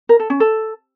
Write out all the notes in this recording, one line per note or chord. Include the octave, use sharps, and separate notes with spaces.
A#4
A4
C#4
A4